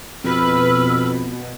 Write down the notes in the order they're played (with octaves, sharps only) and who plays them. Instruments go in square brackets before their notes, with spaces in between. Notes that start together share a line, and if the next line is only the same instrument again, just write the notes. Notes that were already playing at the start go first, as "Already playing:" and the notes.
[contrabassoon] F2 [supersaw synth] B2 [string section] B4 [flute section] E6 F6